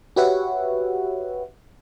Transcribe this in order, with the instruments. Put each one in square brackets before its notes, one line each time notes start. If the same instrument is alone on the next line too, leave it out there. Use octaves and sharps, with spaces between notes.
[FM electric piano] F#4 G4 B4 C#5 E5 F#5